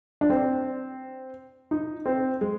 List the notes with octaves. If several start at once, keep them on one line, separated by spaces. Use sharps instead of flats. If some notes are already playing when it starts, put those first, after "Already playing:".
D4
C4
D#4
C4
G#3